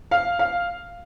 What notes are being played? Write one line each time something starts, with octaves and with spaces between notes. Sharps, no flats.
F5
F5